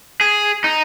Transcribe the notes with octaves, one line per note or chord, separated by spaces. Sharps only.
G#4
D#4